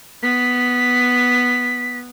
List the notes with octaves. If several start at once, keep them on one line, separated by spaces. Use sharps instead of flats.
B3 B6